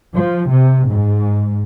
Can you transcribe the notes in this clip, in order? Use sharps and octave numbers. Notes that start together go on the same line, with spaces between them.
F3
C3
G#2